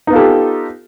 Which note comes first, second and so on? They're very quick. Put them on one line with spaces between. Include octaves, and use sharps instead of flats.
D#4 B3 F4 A4 G4